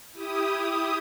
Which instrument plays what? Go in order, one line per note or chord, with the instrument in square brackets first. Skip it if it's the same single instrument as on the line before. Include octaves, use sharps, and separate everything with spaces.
[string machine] E4 G4 D#6